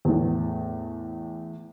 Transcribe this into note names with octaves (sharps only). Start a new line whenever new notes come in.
E2 A2